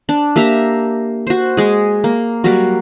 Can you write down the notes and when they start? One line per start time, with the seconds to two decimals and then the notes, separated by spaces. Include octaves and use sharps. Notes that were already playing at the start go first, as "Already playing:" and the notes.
0.09 D4
0.36 A#3 G4 E5 A#5
1.27 F#4 C5
1.57 G#3 G#4
2.04 A#3
2.44 F#3 G3 A#3 F#4